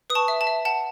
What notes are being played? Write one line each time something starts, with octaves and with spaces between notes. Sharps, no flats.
B4 D#6
A5 C#6
E5
A5
E5
F#5 A5